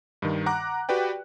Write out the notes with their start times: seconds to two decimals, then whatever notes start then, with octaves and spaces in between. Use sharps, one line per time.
0.22 G2 D#3
0.46 F#5 A#5 D6 F#6
0.89 F#4 G4 B4 D5 G5